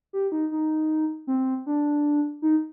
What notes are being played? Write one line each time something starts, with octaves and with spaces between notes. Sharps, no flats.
G4
D#4
D#4
C4
D4
D#4